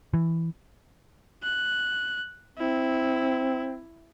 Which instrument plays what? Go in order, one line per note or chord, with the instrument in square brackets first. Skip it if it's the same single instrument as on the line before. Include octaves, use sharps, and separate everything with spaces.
[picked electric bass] E3
[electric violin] F#6
[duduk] C4 [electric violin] E4